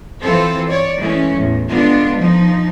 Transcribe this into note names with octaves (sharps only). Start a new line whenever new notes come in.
E3 C4 F4 A4 C5
C#5 D5
E3 G#3 A3 C#4
E2 A2
D3 G#3 B3 D4 F4
F3 D#4